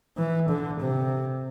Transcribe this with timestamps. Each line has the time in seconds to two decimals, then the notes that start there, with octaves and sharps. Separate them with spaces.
0.18 E3
0.49 D3
0.80 C3